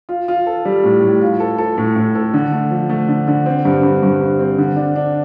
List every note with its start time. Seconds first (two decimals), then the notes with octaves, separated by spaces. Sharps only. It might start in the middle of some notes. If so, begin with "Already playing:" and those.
0.09 F4
0.28 F4
0.47 A4
0.65 G3
0.84 A2
1.02 A2
1.21 F4
1.40 A4
1.58 A4
1.78 A2
1.96 A2
2.15 A4
2.34 D3
2.52 A3
2.70 F3
2.89 A3
3.08 D3
3.28 D3
3.46 C4
3.65 G2
3.83 G2
4.03 G2
4.21 G2
4.40 C4
4.58 D3
4.76 D4
4.96 D4